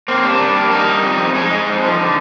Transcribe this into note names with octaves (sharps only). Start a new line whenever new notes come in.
A#3 C4
C3 D4
G3
A#3
G3 D#4
G3
F2
F2
G#3 D#4
G#3
F2
F3
D3